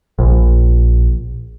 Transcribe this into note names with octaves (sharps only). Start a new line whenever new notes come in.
A#1